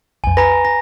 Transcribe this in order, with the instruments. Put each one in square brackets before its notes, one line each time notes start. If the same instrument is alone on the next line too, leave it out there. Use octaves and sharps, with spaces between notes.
[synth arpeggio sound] B1 F2 [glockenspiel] G#5
[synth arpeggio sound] B4 G#5 B5 [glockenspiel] A#5 A#6
[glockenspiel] A#6